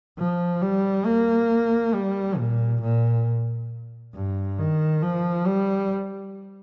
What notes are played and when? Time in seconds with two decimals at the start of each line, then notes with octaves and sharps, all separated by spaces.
0.18 F3
0.62 G3
1.07 A#3
1.95 G3
2.38 A#2
2.82 A#2
4.14 G2
4.59 D#3
5.03 F3
5.46 G3